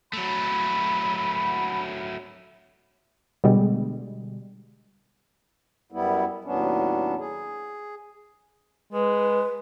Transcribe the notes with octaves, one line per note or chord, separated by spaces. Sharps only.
F#3 A3 B5
B2 D3 G3 G#3
F#2 G3 B3 E4
D#2 A2 F#3 B3 C#4 D4
G#4
G#3 B4